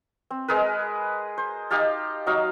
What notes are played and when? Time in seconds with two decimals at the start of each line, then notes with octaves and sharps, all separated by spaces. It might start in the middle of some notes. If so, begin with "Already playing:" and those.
0.31 C4
0.48 G#3 G#4 A#4 B4
1.38 C5
1.70 D#4 G4 F5 A5
2.26 F#3 D#4 F5